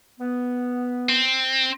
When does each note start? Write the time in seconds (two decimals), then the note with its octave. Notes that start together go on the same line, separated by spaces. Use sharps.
0.20 B3
1.09 C4